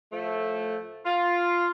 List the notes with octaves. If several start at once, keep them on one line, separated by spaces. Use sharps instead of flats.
A2 F3 A3
F4